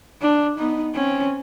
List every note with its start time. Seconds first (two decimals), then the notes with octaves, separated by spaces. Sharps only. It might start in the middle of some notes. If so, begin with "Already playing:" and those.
0.21 D4
0.59 B3 D#4
0.95 C4 C#4